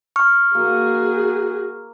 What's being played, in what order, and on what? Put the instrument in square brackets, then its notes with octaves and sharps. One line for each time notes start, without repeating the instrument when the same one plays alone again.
[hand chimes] C#6 F6
[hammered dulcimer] A#3 [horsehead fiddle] F#4 G#4